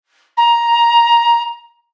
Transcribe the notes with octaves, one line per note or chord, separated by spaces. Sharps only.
A#5